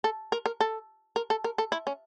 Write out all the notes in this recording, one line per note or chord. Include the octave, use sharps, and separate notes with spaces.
A4
A#4
A#4
A4
A#4
A4
A#4
A4
E4
C#4